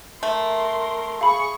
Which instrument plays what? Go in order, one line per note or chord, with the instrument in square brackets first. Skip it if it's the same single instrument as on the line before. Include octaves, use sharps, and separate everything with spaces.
[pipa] A3 [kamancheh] A#4 C6
[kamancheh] G#4 C#6 [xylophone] F5 B5